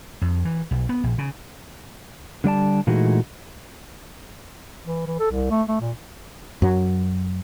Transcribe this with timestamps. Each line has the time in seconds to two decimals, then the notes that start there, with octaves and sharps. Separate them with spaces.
0.22 F2
0.45 E3
0.71 B1
0.89 B3
1.04 A#1
1.18 C#3
2.44 D3 G3 D5 A5
2.87 A#2 E3 G#3 A3 D#4 F#4
4.87 E3
5.07 E3
5.19 A4
5.31 C2
5.51 A3
5.69 A3
5.81 A#2
6.62 F#2 F#3